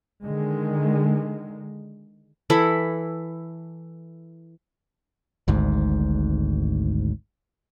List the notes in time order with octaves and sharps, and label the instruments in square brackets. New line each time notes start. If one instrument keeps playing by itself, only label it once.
[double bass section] D3 D#3 G#3
[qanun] E3 E4 A4 B5
[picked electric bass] G#1 D2 G#2